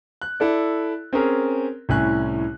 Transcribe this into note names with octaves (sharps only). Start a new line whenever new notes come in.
F#6
E4 A4 D5
C4 C#4 G#4 A#4
C2 A2 C#4 G#5 F#6